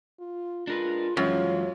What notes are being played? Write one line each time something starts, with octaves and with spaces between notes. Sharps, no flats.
F4
G#3 D4 F4 A#4 B4
F#2 E3 F3 G#3 F4 C#5